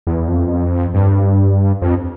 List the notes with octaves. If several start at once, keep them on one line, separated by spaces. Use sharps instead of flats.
E2
F2
G2
F2